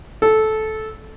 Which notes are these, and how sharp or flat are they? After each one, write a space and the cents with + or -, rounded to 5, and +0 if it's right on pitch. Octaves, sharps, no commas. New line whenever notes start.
A4 -15